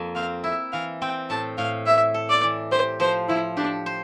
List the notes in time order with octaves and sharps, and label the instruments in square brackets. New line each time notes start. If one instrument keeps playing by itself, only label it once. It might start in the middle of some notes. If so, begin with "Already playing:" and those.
Already playing: [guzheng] F2 F3 A#3
[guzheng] C4 [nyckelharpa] F5
[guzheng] E4 [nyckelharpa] E5
[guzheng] E3 [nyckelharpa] F5
[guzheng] C4 [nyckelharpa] G5
[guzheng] A2 [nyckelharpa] A5
[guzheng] A2 [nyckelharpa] F5
[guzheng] E4 [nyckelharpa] E5
[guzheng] A4
[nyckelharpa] D5
[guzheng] E3
[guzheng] G4 [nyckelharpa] C5
[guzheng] F3 [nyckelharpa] C5
[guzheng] F3 [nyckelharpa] E4
[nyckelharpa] D4 [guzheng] G4
[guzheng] C5